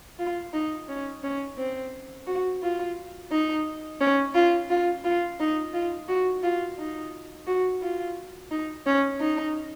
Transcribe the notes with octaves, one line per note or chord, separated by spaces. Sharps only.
F4
D#4
C#4
C#4
C4
F#4
F4
D#4
C#4
F4
F4
F4
D#4
F4
F#4
F4
D#4
F#4
F4
D#4
C#4
D#4